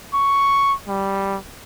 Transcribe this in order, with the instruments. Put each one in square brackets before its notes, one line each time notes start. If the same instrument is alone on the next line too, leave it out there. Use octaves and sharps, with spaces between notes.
[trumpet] C#6
G3